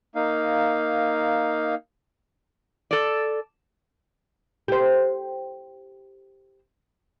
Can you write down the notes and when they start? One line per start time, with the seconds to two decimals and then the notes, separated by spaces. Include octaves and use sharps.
0.15 A#3 D#4 F5
2.91 A4 D5
4.68 G4 C5